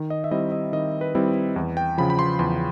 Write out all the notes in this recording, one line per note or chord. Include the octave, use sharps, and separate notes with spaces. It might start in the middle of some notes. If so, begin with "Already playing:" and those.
Already playing: D#3
D#5
E5
G3 C4 E4 D#5
D#5
D#3 D#5
B4
G3 C4 E4
E2
G5
C#3 F3 B5
B5
C6
E2 C6